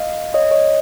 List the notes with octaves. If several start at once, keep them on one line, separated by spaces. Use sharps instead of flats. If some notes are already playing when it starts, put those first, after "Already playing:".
Already playing: D#5 F5
C#5 D#5
C#5 D#5